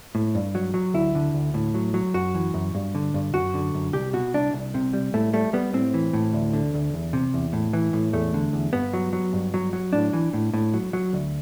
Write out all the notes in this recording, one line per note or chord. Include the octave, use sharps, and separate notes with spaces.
A2
G2
F#3
F#3
D2 E4
D3
D2
A2
F#3
F#3
F#2 F#4
E3
F#2
G2
D3
G2
F#2 F#4
D3
F#2
C2 G4
B2 F#4
C2 D4
C2
C3
G3
A2 A3
G3 A3
G3 B3
A2 C4
E3
A2
D2
D3
D2
E2
C3
E2
A2
E3
A2
E2 A3
D3
E2
G2 B3
F#3
F#3
G2
F#3
F#3
A2 D4
E3
A2
A2
F#3
F#3
D2